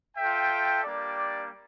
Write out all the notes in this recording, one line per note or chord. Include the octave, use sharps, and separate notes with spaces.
F4 A4 E5 G5
G3 A#3 D4 G4 D5